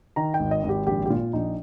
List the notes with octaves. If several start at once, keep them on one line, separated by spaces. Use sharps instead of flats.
D#3 A#5
G5
G#1
D#5
G#1
G4
A#1 G4
G4
A#2 F4
A#1 D#4